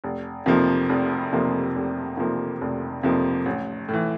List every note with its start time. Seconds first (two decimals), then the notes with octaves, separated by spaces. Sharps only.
0.04 F1
0.46 F2 C3 F3 A#3
0.89 F1
1.32 F2 C3 F3 A#3
1.76 F1
2.17 F2 C3 F3 A#3
2.61 F1
3.03 F2 C3 F3 A#3
3.46 A1
3.88 A2 E3